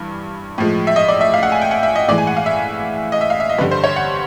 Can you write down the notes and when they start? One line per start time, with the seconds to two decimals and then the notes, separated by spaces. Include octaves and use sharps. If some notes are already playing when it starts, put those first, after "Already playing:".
Already playing: G2 E3
0.58 A2 F3 G#3
0.87 E5
0.96 D#5
1.08 D5
1.21 E5
1.34 F5
1.43 F#5
1.52 G#5
1.61 G5
1.71 F#5
1.83 E5
1.95 D#5
2.08 A2 E3 G#3 D5
2.18 G#5
2.27 F#5
2.37 F5
2.46 E5
3.12 D#5
3.21 E5
3.30 F5
3.40 E5
3.49 D#5
3.59 G2 D3 G3 B4
3.71 C5
3.84 C#5
3.96 F#5